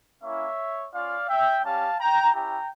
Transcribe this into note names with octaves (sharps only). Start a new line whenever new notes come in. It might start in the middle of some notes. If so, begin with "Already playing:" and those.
A#3 C#4 E4 C#5 E5
C#4 F4 D5 F5
E5 G5
G3 C#4 G4 F5 A5
G5 A#5
C#4 E4 G4 G5 A#5